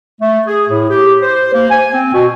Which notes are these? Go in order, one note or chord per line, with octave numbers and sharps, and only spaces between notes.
A3
G#4
A2
G4
C5
A#3
G#5
C4
B2